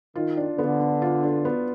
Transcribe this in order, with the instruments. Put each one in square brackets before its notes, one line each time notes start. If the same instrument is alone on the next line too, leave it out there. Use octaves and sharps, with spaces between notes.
[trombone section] D#3 [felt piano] F4
[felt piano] D4
[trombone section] D3 [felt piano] B3
[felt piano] B3
F4
D4
B3